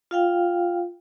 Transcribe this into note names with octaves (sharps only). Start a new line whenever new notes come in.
F4 F5 G5